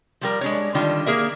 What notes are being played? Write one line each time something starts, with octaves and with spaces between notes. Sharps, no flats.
F3 G3 A#4
G#3 D4 C#5
D3 D#3 G3 D4 F4
A#3 G#4 A#4 E5